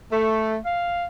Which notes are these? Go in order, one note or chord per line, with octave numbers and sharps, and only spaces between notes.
A3
F5